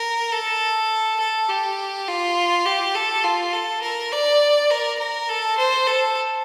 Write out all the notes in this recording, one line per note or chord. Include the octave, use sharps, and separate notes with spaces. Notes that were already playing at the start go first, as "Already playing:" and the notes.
Already playing: A#4
A4
A4
G4
F4
G4
A4
F4
A4
A#4
D5
A#4
A#4
A4
C5
A4